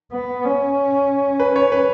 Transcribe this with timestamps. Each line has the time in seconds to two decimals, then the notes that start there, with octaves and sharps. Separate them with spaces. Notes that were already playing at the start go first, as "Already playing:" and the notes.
0.12 B3
0.45 C#4
1.40 B4
1.56 C#5
1.72 B4